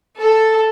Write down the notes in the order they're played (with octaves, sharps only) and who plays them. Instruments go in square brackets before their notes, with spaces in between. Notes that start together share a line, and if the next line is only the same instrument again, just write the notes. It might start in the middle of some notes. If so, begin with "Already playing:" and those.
[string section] A4